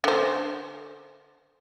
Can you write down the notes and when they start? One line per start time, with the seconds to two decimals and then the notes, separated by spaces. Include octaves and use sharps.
0.04 D3 C5